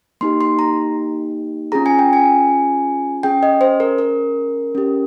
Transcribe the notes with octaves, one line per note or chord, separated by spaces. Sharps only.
A#3 D#4 G4 C6
C6
A#5
C#4 F4 G#4 A#5
G#5
G5
G#5
C#4 G#4 G5
D#5
C5
A#4
A#4
C#4 G4